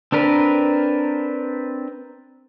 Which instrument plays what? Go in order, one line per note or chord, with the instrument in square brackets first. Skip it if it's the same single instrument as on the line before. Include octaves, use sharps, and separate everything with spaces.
[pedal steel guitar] C4 D4 A#4 B4